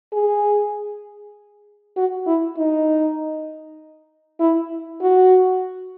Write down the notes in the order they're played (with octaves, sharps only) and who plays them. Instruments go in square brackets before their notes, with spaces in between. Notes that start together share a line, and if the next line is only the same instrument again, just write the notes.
[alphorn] G#4
F#4
E4
D#4
E4
F#4